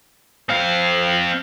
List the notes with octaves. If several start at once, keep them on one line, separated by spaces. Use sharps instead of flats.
C4 F5